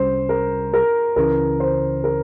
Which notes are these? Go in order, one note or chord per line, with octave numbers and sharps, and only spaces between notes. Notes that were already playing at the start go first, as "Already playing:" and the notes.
Already playing: C2 C3 G3 C#4 C5
A#4
A#4
C#2 C#3 E3 A#4
C5
A#4